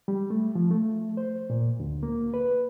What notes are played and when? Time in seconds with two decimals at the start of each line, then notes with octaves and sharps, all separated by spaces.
0.08 G3
0.30 A3
0.55 F3
0.71 A3
1.17 C5
1.50 A#2
1.80 D2
2.03 A#3
2.34 B4